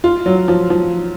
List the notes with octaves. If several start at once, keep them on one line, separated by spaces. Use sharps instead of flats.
F4
F#3
F3
F3